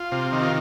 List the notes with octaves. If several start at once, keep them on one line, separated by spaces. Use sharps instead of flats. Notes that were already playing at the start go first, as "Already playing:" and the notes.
Already playing: F4
C3
D#3
F4